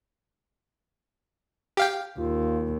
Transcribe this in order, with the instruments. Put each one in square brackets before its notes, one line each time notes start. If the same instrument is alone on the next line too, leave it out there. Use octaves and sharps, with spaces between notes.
[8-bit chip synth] G4 F5 G5
[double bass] D#2 [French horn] F4